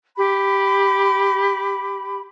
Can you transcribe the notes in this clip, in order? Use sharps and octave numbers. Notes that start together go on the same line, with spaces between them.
G4 B5